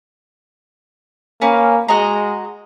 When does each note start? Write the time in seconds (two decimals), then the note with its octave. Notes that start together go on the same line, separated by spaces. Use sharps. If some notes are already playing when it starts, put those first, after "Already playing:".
1.42 A#3 C#4 B4
1.89 G#3 F#4 D#5 A#5